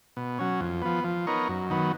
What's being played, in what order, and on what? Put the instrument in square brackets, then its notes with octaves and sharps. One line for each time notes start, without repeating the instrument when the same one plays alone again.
[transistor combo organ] B2
F#3 C#4
F2
F3 B3
F3
B3 D#4 A#4 C#5
F#2
D#3 F#3 B3